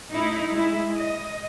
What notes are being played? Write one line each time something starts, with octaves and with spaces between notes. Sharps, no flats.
A3 D#4 E4
G#3 E4
D#5